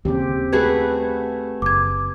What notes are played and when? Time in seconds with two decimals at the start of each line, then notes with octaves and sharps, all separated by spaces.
0.05 D#2 C#3 C4 G4
0.53 A3 F#4 G#4 B4 G#6
1.62 F#1 D6 G#6